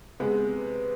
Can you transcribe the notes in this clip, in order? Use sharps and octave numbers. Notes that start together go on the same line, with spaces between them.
C3 G#3 B3